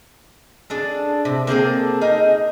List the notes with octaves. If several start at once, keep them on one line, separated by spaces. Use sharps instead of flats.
D4 G#4 A4
C3
A#3 C4 G#4 A4
D#4 G#4 A#4